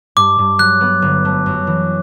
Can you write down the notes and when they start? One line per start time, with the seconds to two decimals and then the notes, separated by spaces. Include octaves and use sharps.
0.17 G2 D6
0.38 G2
0.59 F#3 F#6
0.81 B3
1.02 G1
1.25 A3
1.46 F#2
1.67 E3